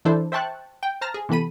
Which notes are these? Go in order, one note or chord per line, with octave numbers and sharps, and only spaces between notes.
E3 D4 E4 A4 C5
C5 E5 G5 A5 C#6 F#6
G5
C5 A5 A#5 F6 A#6
G#4
C3 E3 B3 A4 B5 D#7